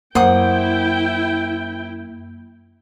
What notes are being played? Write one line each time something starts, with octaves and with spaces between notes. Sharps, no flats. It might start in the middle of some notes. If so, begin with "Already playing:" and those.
F#2 A#3 E4 C5 F#5 G5 D#6